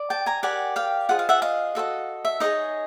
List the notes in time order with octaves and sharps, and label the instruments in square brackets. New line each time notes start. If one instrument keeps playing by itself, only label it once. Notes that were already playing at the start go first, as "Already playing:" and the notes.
Already playing: [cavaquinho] D5
G5 A5
G#5 A#5
G4 A#4 D5 F#5 G#5
F5 G5
F4 G#4 C5 D#5 F#5
F5
E5 F#5
D#5 F5
F#4 A4 C5 D#5
E5
D#4 G#4 C#5 D#5